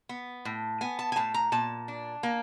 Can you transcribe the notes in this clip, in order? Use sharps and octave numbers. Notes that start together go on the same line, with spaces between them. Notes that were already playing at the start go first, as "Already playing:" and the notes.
B3
A2
B3 G#5
A5
G#5
A2 A5
A#5
A#2 A5
D4
A#3